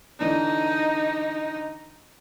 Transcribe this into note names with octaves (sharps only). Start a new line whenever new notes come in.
D3 E3 D4 D#4